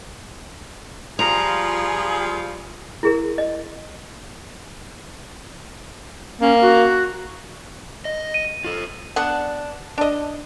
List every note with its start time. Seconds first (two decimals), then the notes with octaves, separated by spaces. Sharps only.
1.19 F3 G3 F4 G#4 A#5
3.03 E4 G#4 A#4
3.38 D#5
6.41 A#3 C#4
6.61 F#4
8.05 D#5
8.34 D#7
8.65 F4 A4
9.16 B3 D4 F#5
9.98 D4 D#5